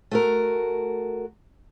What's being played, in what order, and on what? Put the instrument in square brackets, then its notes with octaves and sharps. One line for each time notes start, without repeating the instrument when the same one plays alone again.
[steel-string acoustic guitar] A3 F#4 A#4